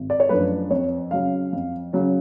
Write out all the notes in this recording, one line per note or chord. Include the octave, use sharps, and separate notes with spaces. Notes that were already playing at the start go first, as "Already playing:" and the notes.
Already playing: G#1
D5
C#5
F#2 F3 A3 D4 B4
F2 C#5
C#3 F#3 C#4 F5
F2
C#3 F#3 C#4